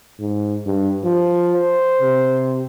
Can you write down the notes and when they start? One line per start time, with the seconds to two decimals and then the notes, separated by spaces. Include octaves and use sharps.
0.19 G#2
0.66 G2
1.04 F3
1.55 C5
2.01 C3